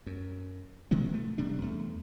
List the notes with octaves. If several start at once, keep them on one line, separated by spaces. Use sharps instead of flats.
F#2
B2 D#3 G#3 B3
A3
E1 C3 G3 D4
E2 A3